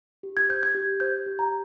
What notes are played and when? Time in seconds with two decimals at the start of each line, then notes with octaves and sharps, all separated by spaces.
0.23 G4
0.37 G#6
0.49 C5 G6
0.63 G#6
0.75 G4
1.00 C5 G6
1.26 G4
1.39 A#5